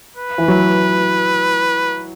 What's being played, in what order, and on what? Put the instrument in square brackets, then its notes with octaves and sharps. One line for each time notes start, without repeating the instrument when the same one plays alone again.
[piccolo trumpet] B4
[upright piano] E3
F#3